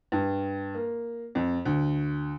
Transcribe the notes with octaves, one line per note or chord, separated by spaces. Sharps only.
G2
A#3
F2
D2